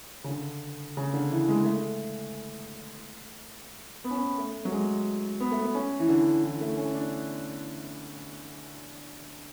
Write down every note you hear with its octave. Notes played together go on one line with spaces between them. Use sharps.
C#3
D3
C#3
D3
E3
G#3
A3
B3
C#4
B3
A3
F#3
G#3
B3
A3
B3
C#4
E3
D3
E3
A3
C#4
D4